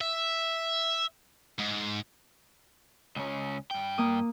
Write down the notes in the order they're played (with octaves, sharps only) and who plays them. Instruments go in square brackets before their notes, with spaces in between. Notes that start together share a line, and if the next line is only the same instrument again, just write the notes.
[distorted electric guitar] E5
G#2
[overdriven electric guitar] C#2 C#4
G2 G5
[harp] A#3 D#6